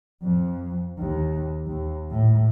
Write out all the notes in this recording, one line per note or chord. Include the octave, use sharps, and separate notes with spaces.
F2
D#2
D#2
A2